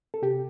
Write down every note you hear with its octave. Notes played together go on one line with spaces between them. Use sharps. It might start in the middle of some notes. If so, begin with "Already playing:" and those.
A4
C3 G4